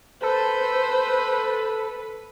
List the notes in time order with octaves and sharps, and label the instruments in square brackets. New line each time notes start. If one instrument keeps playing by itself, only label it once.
[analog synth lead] A4 [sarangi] B4 [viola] C5